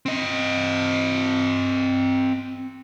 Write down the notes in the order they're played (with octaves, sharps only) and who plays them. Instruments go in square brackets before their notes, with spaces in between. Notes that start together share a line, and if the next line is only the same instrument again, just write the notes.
[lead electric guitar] C4 D#5